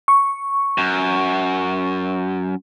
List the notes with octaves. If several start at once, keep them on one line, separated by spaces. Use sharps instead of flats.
C#6
F#2